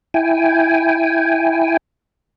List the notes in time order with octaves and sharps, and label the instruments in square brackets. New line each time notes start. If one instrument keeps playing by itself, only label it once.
[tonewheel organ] E4 G5 G#5